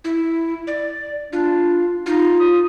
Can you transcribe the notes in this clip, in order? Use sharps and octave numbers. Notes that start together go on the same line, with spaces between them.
E4
D5
D4 F4
D#4 F4
D#6